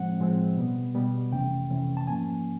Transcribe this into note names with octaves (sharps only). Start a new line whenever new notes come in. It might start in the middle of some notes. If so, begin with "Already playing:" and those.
Already playing: A2 F3 G#3 C4 F#5
A2 F3 G#3 C4
B2 G3 B3
B2 G3 B3
F2 C3 E3 A3 C#4 G5
F2 C3 E3 A3 C#4
A5
G#2 F3 A#3 C#4 G#5